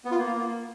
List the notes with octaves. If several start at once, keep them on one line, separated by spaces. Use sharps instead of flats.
B3
F4
A#3